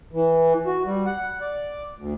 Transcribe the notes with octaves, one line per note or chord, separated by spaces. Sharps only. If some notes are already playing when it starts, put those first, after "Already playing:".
E3
F#4
G3
F#5
D5
D2